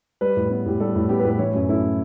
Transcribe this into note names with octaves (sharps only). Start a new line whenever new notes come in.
G3 B4
A2
B3
A2 G4
G3 A4
A2
B3 G4
B4
A2
B4
E3 C#5
F#2
A3 E4